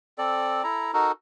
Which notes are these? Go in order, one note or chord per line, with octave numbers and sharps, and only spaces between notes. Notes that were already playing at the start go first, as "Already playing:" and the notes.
C4 A4 D5
E4 A4 A#5
D#4 F#4 A4 A#4